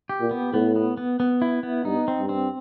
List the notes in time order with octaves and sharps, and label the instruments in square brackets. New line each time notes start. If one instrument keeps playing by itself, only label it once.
[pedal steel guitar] G4
[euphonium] A#2
[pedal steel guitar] B3
[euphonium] A2 [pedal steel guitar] B3
[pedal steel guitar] B3
B3
B3
E4
B3
[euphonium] G2 [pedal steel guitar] D#4
[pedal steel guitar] C4
[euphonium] G2
[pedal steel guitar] C4